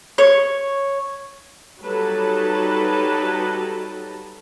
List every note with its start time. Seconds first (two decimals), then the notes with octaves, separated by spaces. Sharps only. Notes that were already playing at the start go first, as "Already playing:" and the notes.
0.18 C#5
1.82 F#3 G3 D#4 A4 B4 A5